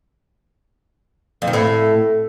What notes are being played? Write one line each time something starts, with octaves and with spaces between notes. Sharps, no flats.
F2
D#3
A2